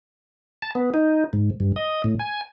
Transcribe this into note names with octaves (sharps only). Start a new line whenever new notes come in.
A5
B3
D#4
G#2
G2
D#5
A2
G#5